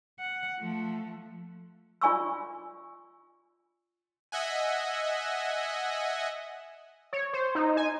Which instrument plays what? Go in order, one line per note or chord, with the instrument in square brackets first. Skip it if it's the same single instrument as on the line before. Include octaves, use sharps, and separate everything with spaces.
[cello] F#5
F3 A3
[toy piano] F4 D5 G#5 C#6 E6
[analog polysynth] D#5 E5 F#5 G#5
[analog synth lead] C#5
C5
D#4
G#5